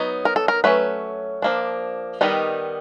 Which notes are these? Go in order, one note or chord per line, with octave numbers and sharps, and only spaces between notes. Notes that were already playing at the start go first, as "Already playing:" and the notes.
Already playing: F#3 B3 D#4
A#4
A4
A#4
F#3 A3 C#4 B4
F3 A#3 D4
D#3 G3 B3 D#4